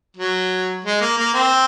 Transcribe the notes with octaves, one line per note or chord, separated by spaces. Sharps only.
F#3
G#3
A#3
A#3
C4